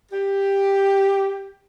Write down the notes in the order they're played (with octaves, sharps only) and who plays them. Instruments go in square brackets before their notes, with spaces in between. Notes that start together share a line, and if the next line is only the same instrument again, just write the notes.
[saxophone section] G4